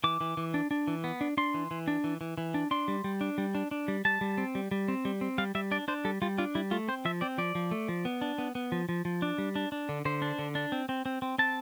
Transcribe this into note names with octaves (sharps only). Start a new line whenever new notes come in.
E3 D6
E3
E3
D4
D4
E3
B3
D4
D4 C6
E3
E3
D4
E3
E3
E3
D4
D4 C6
G3
G3
D4
G3
D4
D4
G3
G3 A5
G3
C4
G3
G3
C4
G3
C4
G3 F5
G3 E5
D4 D5
D4 C5
G3 A4
G3 F4
D4 F4
G3 E4
A3 F4
C4 C5
F3 E5
C4 D5
F3 D5
F3
A3
F3
B3
D4
B3
B3
F3
F3
F3
D4
G3
D4
D4
D3
D3 C5
D4
D3
D4
C4
C4
C4
C4
C4 A5